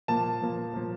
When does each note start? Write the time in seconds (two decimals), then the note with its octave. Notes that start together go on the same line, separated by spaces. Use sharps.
0.08 A#2 F3 A#3 A5
0.41 A#2 F3 A#3
0.74 A#2 F3 A#3